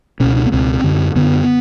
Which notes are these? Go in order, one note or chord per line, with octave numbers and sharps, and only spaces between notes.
C#2 B2 C#4
D4
B3
C#2 B2 C4
F#2 D3
F#2 D3 B3